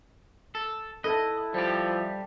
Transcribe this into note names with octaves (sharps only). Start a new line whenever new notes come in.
A4
E4 A4 B4 D#5 A5
F3 G3 G4